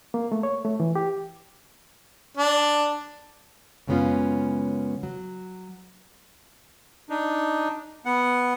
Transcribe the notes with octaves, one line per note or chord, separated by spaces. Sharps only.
A#3
A3
C#5
A3
E3
G4
D4
F#2 C#3 G#3 B3 C#4 F4
F#3
D4 D#4
B3 F#5